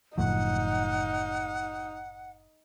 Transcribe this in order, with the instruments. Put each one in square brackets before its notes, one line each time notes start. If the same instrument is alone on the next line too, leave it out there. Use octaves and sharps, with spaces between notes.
[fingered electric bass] F#1 A2 F3 [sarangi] D#4 [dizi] F#5